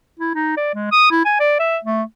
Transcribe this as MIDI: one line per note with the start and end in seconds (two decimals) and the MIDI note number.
0.19 0.33 64
0.35 0.55 63
0.57 0.75 74
0.75 0.91 56
0.92 1.10 87
1.11 1.24 64
1.25 1.36 80
1.40 1.56 74
1.59 1.78 76
1.84 2.03 57